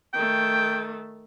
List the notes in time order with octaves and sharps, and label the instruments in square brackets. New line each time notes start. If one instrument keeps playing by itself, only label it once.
[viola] D#3 A3 [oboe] G5